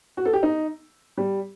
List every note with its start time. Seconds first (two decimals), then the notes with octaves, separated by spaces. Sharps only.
0.17 F#4
0.25 A4
0.33 G4
0.43 D#4
1.17 G3